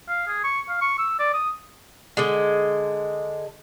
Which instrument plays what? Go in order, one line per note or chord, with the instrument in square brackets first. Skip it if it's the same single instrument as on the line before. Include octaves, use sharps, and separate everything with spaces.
[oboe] F5
G#4
C#6
F5
C#6
E6
D5
D#6
[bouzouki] D3 G#3